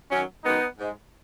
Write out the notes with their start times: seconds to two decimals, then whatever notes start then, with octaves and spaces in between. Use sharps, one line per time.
0.11 F#2 D#3 F#3 C#4
0.45 F#2 D#3 G#3 B3 D#4
0.79 G#2 G#3